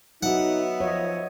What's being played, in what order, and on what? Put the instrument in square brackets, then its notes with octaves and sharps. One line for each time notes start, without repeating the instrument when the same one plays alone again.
[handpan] F#3 F#4 [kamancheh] B3 E5 [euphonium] D#4 [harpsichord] F#5
[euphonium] F3 [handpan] C#5 D#5